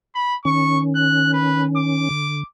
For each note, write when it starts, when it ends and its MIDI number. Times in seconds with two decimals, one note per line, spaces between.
0.15 0.35 83
0.45 2.09 51
0.45 2.09 61
0.45 0.79 85
0.96 1.29 90
1.33 1.63 71
1.77 2.44 86
2.11 2.44 50